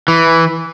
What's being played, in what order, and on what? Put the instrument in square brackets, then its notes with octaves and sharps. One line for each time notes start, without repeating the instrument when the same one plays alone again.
[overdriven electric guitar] E3